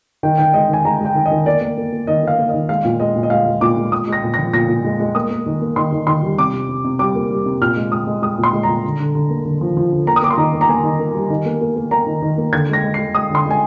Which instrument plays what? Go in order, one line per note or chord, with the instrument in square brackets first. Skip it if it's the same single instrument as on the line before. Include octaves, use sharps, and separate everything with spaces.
[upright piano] D#3 G5
D#3 G5
G#3 D#5
D#3 G#5
G#3 A#5
G#3 G5
D#3
D#5
D#3
A#3 D5
A#3
A#3
A#3
D#3 D#5
A#3 F5
A#3
D#3 D#5
G#3 F5
A#2
G#3 D#5
A#2
D#5
G#3 F5
G#3
A#2 D6
G#3
A#2 D#6
G#3
A#6
A#2
F3 A#6
A#2 A#6
A#2
G#3
G#3
A#3 D#6
A#3
D#3
A#3
D#3 C6
D#3
D#3 C6
G3
C3 D6
C3
C3
C3
G3 D6
A#3
G3
C3
A#2 F6
G#3
G#3 D#6
G#3
G#3 D#6
A#2
C6
G#3
A#2 A#5
D3
D3
D3
A#3
D3
F3
F3
D3
A#3 A#5
D#6
A#3 D6
C6
D#3 A#5
A#3
A#5
A#3 G#5
D#3
A#3
G3
D#3
A#3
A#3
A#3
A#3 A#5
D#3
D#3
A#3
D3 G#6
G#3 A#6
G#3
G#3 C7
G#3 D#6
D3 C6
G#3
G#5